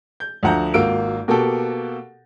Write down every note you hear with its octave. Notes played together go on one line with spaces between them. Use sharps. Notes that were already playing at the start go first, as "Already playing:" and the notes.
G6
D2 F3 F#5 A#5 G6
G#1 A#3 F4 F#4 E6 D7
B2 A#3 F#4 G4 A4